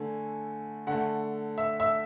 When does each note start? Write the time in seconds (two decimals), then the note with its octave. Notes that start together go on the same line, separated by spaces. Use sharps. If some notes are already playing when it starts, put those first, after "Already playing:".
Already playing: D3 A3 G#5
0.87 D3 A3 F#5
1.58 E5
1.80 E5